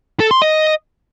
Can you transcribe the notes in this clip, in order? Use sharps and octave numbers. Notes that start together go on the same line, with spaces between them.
A4
C6
D#5